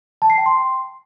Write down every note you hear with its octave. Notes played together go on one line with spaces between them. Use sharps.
A5
C7
G5
C6